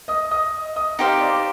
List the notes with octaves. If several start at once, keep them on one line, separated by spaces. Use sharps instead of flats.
D#5 D#6
D#5 D#6
D#5 D#6
D#4 G4 C5 F5
D5 D6